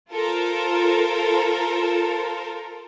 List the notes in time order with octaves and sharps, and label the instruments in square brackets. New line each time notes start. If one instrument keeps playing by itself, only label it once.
[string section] F4 A4 A#4 C5